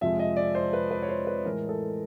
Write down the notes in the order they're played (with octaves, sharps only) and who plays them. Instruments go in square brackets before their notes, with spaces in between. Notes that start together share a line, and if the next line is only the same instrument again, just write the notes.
[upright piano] F2 C3 F3 G#3 E5
D#5
D5
C5
B4
B4
C#5
C5
B4
A2 E3 G#3 A#4
A4